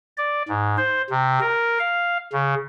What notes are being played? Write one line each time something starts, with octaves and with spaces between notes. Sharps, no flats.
D5
G#2
C5
C3
A#4
F5
C#3